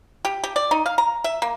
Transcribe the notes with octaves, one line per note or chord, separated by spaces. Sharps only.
G4
G4
D5
D#4
F5
A#5
E5
A#3